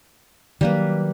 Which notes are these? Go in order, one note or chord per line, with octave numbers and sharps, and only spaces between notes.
D#3 F#3 G3 A#3 D4 B4